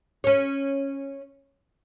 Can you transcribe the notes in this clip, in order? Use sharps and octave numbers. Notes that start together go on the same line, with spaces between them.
C#4 C#5